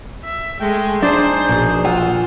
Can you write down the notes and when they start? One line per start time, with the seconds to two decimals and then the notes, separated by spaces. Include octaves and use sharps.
0.24 E5
0.60 G#3 A3 G5
1.02 D4 D#4 G#4 C5
1.49 A#1 B2
1.85 F4 F#5 G#5 E6